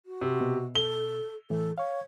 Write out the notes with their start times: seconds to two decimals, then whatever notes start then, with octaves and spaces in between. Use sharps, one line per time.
0.06 F#4
0.21 C3
0.41 B2
0.75 A4 G7
1.50 A2 E3 A4
1.78 C#5 F5 C#6